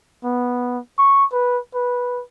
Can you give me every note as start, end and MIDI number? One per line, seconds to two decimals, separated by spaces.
0.24 0.79 59
0.98 1.25 85
1.32 1.59 71
1.74 2.23 71